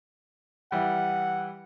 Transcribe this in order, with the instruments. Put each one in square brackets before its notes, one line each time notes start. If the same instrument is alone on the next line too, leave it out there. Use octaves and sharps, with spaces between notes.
[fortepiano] E3 G3 [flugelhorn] F#5